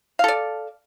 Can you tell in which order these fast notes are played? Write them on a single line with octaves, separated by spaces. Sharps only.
F5 A4 D5